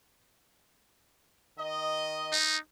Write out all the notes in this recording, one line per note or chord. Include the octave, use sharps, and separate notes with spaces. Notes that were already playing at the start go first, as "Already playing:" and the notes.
D#3 D#5
D#4